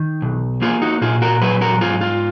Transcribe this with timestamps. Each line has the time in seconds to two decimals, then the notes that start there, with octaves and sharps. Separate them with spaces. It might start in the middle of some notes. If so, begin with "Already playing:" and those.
Already playing: D#3
0.22 B1
0.62 A#3 F4 G#4
0.82 D#4 F#4
1.01 A#2 F4 G#4
1.22 F#4 A#4
1.42 F#3 G#4 B4
1.61 F#4 A#4
1.81 G#2 F4 G#4
2.01 F4